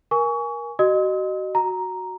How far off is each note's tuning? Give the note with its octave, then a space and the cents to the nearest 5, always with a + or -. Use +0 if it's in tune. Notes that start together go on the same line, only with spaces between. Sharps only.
A#4 +20 G#5 +0 C#6 +30
F#4 +30 D#5 -20 D#6 +45
F#4 +0 A#5 +0